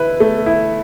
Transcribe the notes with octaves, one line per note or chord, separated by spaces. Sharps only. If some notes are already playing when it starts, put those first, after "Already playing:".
Already playing: E4 B4
A3
E4